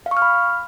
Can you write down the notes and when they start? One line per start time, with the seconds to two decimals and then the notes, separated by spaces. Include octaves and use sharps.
0.06 F5
0.11 C#6
0.17 F6
0.22 B5